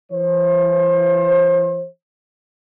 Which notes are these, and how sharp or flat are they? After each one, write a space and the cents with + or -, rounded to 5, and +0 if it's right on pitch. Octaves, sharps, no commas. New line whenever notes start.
E3 +40 C5 +35